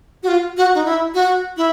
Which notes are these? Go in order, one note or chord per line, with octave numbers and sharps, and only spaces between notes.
F#4
F4
F#4
D#4
E4
F#4
E4